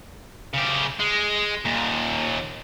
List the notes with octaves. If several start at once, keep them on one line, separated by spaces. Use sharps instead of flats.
C#3 G4
G#3
D#2 A#2